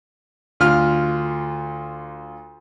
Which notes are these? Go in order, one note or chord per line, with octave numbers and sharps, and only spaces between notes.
D2 F4 F6